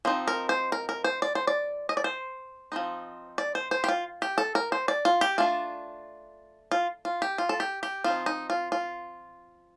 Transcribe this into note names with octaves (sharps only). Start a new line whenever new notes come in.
F3 C4 D#4
A#4
C5
A#4
A#4
C5
D5
C5
D5
D#5
D5
C5
F3 C4 D#4
D5
C5
C5
G4
F4
G4
A4
A#4
C5
D5
F4
G4
A3 D4 F4
F4
F4
G4
F4
A4
G4
G4
F3 C4 D#4 F4
D#4
F4
F4